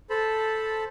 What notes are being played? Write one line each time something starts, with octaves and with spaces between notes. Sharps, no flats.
A4 C5 A5 B5